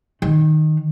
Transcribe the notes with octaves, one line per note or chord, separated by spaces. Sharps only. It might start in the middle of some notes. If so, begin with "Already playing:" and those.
D#3